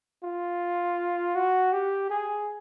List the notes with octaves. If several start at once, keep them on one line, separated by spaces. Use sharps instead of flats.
F4
F#4
G4
G#4